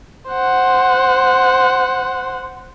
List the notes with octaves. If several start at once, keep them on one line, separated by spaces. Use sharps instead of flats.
C5 F#5